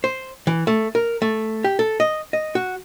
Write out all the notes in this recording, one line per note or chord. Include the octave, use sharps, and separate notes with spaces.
C5
E3
A3
A#4
A3
G4
A4
D#5
D#5
F#4